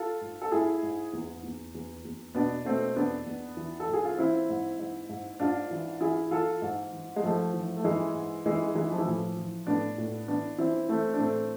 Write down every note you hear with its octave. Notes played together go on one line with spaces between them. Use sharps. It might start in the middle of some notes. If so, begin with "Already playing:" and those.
Already playing: F4 A4
G#2
A4
G#2 E4 G#4
G#2
E2
E2
E2
E2
B2 B3 D4
B2 A3 C4
E2 B3 D4
E2
E3
A4
G#2
G#4
F4
E3 C4 E4
G#2
G#2
G#2
G#2 D4 F4
E3
E3 E4 G#4
E3 F4 A4
G#2
E3
G#3
G#2 F3 A3
E3
A3
G#2 E3 G#3
G#2
E3 G#3
E3 G#3
F3
E3
A2 F3
E3
A2 B3 D4
A2
E3 B3 D4
E3 C4 E4
E3 A3 C4
D4
A2 A3 C4